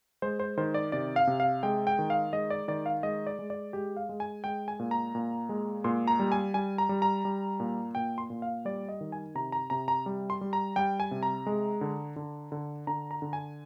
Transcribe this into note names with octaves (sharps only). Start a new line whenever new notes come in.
G#3 C5
C5
D#3 C5
D5
C3 D5
F5
C3
F5
G#3 G5
G5
D#3
F5
G#3 D#5
D5
D#3 D5
F5
G#3 D#5
D5
G#3
D5
G#3 G4
F5
G#3
G#5
G#3 G5
G#5
A#2
A#5
A#2
G#3
A#2 C6
A#5
G3
G#5
G3 G#5
A#5
G3
A#5
G3
A#2
A#2 G5
C6
A#2
F5
G3 D5
D#5
D#3
G#5
C3 A#5
A#5
C3 A#5
A#5
G3
C6
G3
A#5
G3 G5
G#5
C3
A#5
G#3
D3
D3
D3
D3 A#5
A#5
D3
G#5